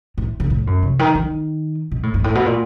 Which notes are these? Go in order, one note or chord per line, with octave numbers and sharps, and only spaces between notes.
A2
C#3
A2
F#2
C3
D#3
D#3
B2
A2
G#2
A2
B2
A#2